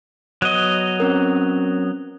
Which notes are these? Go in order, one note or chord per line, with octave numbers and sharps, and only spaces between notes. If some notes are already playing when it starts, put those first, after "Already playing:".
F#3 B3 D#5
C4 C#4 A#4